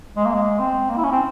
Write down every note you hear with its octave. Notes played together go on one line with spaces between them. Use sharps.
G#3
A#3
G#3
C4
A#3
E4
C#4
C4